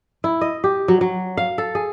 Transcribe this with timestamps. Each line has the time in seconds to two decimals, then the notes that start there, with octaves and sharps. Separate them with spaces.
0.24 E4
0.41 D#5
0.64 G4
0.88 F#3
1.01 F#3
1.37 F5
1.58 A4
1.75 G#4